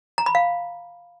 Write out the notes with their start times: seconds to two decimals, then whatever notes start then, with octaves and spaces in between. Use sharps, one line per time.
0.18 A#5
0.26 B5
0.35 F5